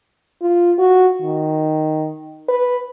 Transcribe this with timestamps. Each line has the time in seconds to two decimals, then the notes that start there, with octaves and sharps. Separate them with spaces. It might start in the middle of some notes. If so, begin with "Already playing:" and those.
0.42 F4
0.78 F#4
1.22 D#3
2.48 B4